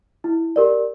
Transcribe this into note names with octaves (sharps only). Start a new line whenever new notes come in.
E4
G4 A#4 D5